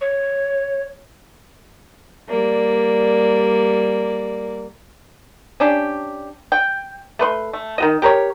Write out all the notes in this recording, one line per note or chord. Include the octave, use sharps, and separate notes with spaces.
C#5
G3 A#3 D5
C#4 D4 G4
G5
A3 B4 C6
A3
D#3 F#4 D#5
G4 A#4 B4 C#5